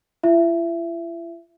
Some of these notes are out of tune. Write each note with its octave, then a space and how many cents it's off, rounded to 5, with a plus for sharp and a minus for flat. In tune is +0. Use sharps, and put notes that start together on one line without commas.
E4 +45 E5 +20